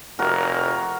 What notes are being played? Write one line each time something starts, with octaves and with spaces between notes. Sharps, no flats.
F1 F#4 A#4